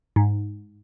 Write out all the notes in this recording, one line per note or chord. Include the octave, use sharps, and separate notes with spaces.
G#2